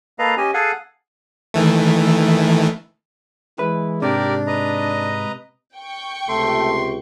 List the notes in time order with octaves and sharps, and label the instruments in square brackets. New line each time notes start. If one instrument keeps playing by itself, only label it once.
[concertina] A#3 A4 B4 D#5 F5 A#5
C#4 G4 D#5 G#5
G#4 A4 F5 F#5 G#5
[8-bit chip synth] D#3 E3 A3
[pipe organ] E3 G#3 E4 [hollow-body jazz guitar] B4
[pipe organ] G#2 [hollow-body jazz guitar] C3 [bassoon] D4 [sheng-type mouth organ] G4 A#4 D5
[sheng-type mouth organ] B4 D#5 A#5
[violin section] G5 C#6
[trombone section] C#2 C3 [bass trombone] A3 [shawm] C6